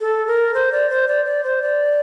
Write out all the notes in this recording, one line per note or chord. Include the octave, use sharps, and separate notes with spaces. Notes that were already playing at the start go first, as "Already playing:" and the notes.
A4
A#4
C5
D5
C5
D5
D5
C5
D5